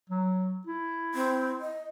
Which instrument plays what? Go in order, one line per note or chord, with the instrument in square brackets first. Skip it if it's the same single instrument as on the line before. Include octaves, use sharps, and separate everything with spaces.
[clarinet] F#3
E4
[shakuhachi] C4
D#5